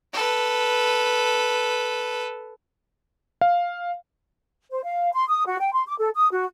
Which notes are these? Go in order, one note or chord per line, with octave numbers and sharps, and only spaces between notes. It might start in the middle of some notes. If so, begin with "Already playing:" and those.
A4 B4
F5
C5
F5
C6
D#6
F#4
G5
C6
D6
A4
D#6
F#4